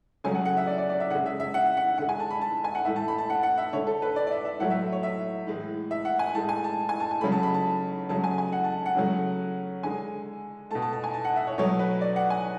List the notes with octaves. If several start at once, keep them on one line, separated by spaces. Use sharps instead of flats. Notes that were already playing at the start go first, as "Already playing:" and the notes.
C#3 F#3 A3 G#5
F#5
F#5
E5
D5
D5
D5
E5
C#3 G#3 F#5
E5
E5
F#5
F#5
D3 G#3 F#5
G#5
A5
B5
A5
G#5
F#5
A2 E3 A3 E5
A5
B5
A5
F#5
F#5
E5
D3 A3 C#5
A4
B4
D5
D5
E5
E5
A2 F#3 A3 F#5
E5
C#5
E5
A2 E3 G#3
E5
F#5
G#5
A2 G#3 A5
G#5
A5
G#5
A5
G#5
C#3 F#3 A3 B5
A5
B5
A5
C#3 F#3 A3 A5
G#5
G#5
F#5
A5
F#5
C#3 F#3 A3
D3 G#3 G#5
B2 A3 A5
A5
A5
G#5
A5
F#5
E5
C#5
B2 F#3 A3 C#5
B4
D5
F#5
G#5